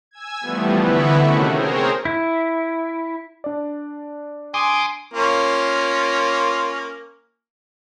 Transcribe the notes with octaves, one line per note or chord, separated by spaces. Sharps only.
G#5 E6 G#6
E3 F3 G3 A3 B3
D3 E3 B3 E4 B5 C#6
C3 D#3 A3 A#3 C#4 F#4
C4 G#4 A#4 C5 C#5
E4
D4 D5
G#5 C6 D6 D#6
A#3 C#4 F4